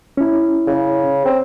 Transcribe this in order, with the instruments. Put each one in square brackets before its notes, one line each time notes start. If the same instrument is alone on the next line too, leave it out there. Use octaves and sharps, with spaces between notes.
[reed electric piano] C#4 E4
[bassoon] C#3
C4